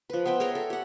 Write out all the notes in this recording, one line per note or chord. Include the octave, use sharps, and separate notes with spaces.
F3 B4
B3 C5 E5 G5
G#4 A#4 C#5 G5
A4
G4 F#5